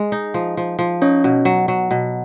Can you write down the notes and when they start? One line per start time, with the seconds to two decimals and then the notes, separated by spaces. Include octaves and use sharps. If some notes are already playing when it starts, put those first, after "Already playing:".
Already playing: G#3
0.12 D#4
0.34 F3
0.57 F3
0.79 F3
1.02 C#4 D#4 C#5
1.24 B2
1.45 F#3
1.68 F#3
1.91 B2